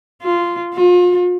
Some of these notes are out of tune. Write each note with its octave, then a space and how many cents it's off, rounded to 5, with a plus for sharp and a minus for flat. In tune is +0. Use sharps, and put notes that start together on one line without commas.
F4 -10
F4 +35